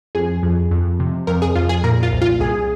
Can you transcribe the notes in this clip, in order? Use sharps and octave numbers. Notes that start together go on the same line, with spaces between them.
F2 G#4
F2
F2
C3
F2 A#4
G#4
F2 F4
G#4
A#2 A#4
F4
C2
F4
C2 G#4